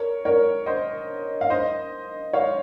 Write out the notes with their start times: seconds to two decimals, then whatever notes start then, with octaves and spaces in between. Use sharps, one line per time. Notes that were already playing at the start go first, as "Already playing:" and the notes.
Already playing: A#4 C#5
0.25 A#4 C#5
0.66 C5 D#5
1.41 F5
1.50 C5 D#5
2.33 C#5 F5